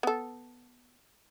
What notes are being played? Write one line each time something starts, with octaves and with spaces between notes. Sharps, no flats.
B3 A4